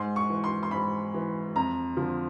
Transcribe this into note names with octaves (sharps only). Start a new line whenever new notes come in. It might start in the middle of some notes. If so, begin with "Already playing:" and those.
Already playing: G#2 C6
C#6
E3
C6
C6
G#2 B5
E3
F2 A#5
D3 F3